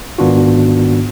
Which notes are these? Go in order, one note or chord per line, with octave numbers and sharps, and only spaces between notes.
G#2 D#3 B3 D4 F4 F#4